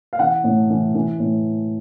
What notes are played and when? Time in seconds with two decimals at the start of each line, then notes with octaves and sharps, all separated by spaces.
0.13 F5
0.19 E3 F#5
0.44 A2
0.70 E3
0.95 E3
1.20 A2